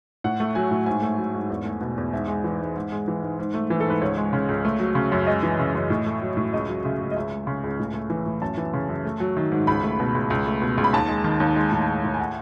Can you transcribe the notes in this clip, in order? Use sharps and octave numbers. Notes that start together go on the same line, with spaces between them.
A2 F#5
A3
F#3 G#5
A2
G#2 G#5
A3
F#3
G#2
E2
A3
B2
E2
G#2 E5
G#3
E3
G#2
G#2
G#3
E3
G#2
G#2
A3
E3
A4
G#2 B4
C#2 C#5
G#3
C#3
C#2
A3
F#3
C#3
F#2
G#3 D#5
E3
C#3
F#2
A2
A3
F#3
A2
C#2 D#5
F#3
C#3 E5
C#2
D#5
C#2 E5
G#3
C#3
C#2
A2
A3
E3
A2
F#2 A5
E3
C#3
F#2
A3
F#3
D#3
G#2
C#2 B5
A3
B2
C#2
C#2
A3
B2
C#2
B5
D#2 A5
G#3
D#3
D#2
G#3
A2
G#3
A2
G#5
F#5